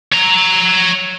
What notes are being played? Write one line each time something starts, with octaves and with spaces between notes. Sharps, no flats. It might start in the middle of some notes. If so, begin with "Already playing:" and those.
C#5 A#5